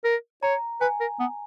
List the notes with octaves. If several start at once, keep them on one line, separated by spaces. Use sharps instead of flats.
A#4
C#5 A#5
B4 G#5
A#4
B3